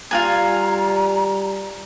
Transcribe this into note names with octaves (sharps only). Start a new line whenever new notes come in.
G3 F4 F#4 G#5 A#5